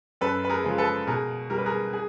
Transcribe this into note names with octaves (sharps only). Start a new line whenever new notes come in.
F#2 A4 B4
B4
G#4 A#4
C#3 F3 G#3
A4 B4
B2 G#4 A#4
G3 A#4
B4
G#4 A#4
G#4